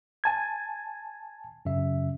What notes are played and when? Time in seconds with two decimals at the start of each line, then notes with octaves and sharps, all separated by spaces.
0.24 G#5 A5 G#6
1.65 F#2 C#3 E5